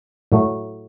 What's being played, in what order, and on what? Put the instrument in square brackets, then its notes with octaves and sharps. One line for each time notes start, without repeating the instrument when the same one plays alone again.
[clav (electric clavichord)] A2 F#3 A3